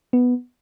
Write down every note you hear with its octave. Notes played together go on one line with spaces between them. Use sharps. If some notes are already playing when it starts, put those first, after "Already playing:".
B3